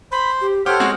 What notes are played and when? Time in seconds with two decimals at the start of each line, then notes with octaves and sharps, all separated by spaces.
0.12 C5 B5 C6
0.41 G4
0.66 G4 A4 C5 C#5 F#5 F6
0.80 G#3 C4 F#4